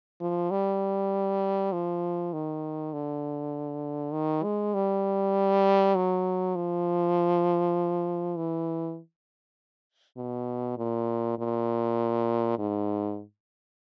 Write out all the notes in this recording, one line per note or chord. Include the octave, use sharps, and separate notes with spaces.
F3
G3
F3
D#3
D3
D#3
G#3
G3
F#3
F3
E3
B2
A#2
A#2
G#2